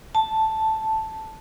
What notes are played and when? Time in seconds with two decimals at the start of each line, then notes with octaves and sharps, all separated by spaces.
0.15 A5